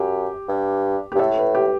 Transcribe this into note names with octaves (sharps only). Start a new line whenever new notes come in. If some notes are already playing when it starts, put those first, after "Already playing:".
Already playing: F#2 G4
G2
G4
G2
A2 A4
B4
G4